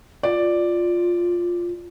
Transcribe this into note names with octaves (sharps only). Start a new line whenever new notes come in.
F4 D5